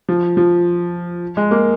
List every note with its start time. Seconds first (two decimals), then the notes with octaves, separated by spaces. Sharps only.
0.09 F3
0.37 F3
1.37 G#3
1.51 A#3